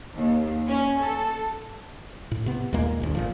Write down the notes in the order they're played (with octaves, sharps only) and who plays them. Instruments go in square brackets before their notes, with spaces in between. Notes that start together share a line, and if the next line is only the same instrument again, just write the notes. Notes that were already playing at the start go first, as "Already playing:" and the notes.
[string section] D#2
C#4
A4
[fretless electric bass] A2
C3 B3
D#2 A#2 G#3 A#3
G1 D2
G#1 A#2 F3